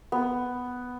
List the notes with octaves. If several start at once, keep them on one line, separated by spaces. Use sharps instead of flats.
B3